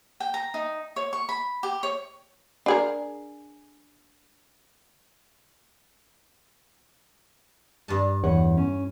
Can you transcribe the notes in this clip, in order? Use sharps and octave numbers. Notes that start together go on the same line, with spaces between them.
G5
A#5
D#4
C#5
C#6
B5
G4
C#5
D4 G#4 A#4
G2 D4 A5
E2 C#5 F#5
C#4